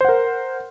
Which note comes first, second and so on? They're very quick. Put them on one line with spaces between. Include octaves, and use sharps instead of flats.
C5 F#5 A#4